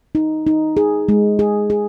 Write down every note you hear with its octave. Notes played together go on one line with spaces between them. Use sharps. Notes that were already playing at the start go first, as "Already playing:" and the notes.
D#4
D#4
G#4
G#3
G#4
G#4